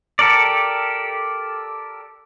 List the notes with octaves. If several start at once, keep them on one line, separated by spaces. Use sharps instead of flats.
G4 A4 A#4 D5